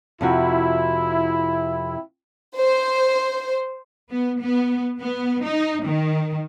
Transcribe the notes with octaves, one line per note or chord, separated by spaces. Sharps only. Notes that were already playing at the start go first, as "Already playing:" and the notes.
F2 C3 E4 F#4
C5
B3
B3
B3
D#4
D#3